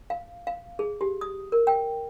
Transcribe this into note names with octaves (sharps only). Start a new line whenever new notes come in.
F5
F5
G#4
G4
D#6
A#4
G5